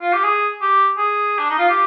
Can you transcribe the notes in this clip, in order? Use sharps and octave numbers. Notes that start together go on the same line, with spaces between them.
F4
G4
G#4
G4
G#4
D4
D#4
F4
G4